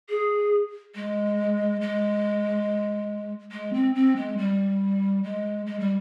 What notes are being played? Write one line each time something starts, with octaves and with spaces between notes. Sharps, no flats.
G#4
G#3
G#3
G#3
C4
C4
G#3
G3
G#3
G#3
G3